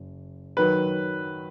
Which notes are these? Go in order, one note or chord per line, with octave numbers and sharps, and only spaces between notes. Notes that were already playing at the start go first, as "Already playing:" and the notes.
Already playing: F#1
D#3 F#3 B4